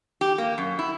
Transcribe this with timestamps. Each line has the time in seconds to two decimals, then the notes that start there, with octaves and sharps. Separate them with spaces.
0.21 G4
0.38 A#3
0.58 F#2
0.79 E4